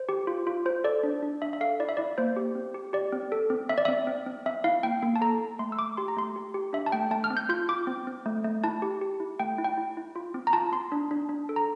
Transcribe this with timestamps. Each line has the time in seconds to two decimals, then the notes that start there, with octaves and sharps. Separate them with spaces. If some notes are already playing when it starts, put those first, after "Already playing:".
Already playing: C5
0.09 G4
0.27 F4
0.47 F4
0.65 F4 C5
0.84 A4 D5
1.03 D4
1.22 D4
1.42 D4 E5
1.53 E5
1.61 A4 F5
1.80 E4 D5
1.89 E5
1.97 E4 D5
2.18 A#3 C5
2.36 G4
2.55 C4
2.74 G4
2.93 G4 D5
3.12 C4
3.32 A4
3.50 C4
3.69 C4 E5
3.78 D5
3.85 C4 E5
4.07 C4
4.26 C4
4.46 C4 E5
4.64 E4 F5
4.83 A#3 G5
5.02 A#3
5.16 A5
5.21 A4 A#5
5.40 A#3
5.59 A3 C6
5.72 E6
5.78 A3 D6
5.97 G4 C6
6.08 A#5
6.17 A3 C6
6.36 G4
6.54 G4
6.73 D4 E5
6.86 A5
6.92 A3 G5
7.11 A3 A5
7.24 F6
7.30 C4
7.37 G6
7.49 F4 G6
7.69 F4 D6
7.87 C4
8.07 C4
8.26 A3
8.44 A3
8.64 E4 A5
8.82 G4
9.01 G4
9.20 E4
9.39 A3 G5
9.58 E4
9.64 G5
9.77 E4
9.97 E4
10.16 F4
10.34 C4
10.47 A#5
10.53 F4 A5
10.72 C4 C6
10.92 D4
11.11 D4
11.29 D4
11.49 A4
11.56 A#5